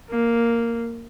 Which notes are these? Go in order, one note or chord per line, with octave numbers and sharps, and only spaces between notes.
A#3